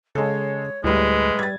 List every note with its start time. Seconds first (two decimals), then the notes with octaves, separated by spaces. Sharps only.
0.15 C#3 G#3 A4 C#5
0.84 D2 A2 G3 G#3 B4
1.39 G3 G#6 A6